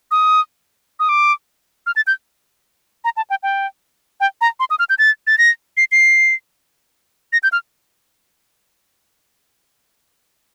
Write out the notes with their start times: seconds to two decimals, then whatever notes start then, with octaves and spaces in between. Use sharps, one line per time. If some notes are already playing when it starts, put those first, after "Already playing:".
0.11 D#6
1.00 D#6
1.09 D6
1.87 F6
1.96 A6
2.07 G6
3.04 A#5
3.17 A5
3.30 G5
3.43 G5
4.20 G5
4.41 A#5
4.60 C6
4.70 D#6
4.79 F6
4.90 G6
4.99 A6
5.27 A6
5.38 A#6
5.77 C7
5.92 C7
7.33 A#6
7.43 G6
7.52 F6